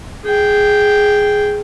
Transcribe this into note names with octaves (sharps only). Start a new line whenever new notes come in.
G#4 G5